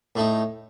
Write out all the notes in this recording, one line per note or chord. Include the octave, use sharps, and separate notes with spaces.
A2 A3 D#4